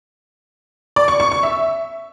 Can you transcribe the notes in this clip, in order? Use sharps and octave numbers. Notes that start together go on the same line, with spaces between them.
D5
C#6
C#6
C#6
E5